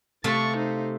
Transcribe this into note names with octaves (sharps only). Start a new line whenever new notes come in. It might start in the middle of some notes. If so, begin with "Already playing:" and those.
C3 A3 F5 C#6 A6
D#4 C5